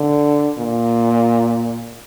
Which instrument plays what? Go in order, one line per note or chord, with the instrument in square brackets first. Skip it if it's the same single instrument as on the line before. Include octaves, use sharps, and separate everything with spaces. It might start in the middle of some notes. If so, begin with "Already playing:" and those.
Already playing: [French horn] D3
A#2